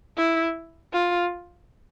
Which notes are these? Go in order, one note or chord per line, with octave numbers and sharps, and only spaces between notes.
E4
F4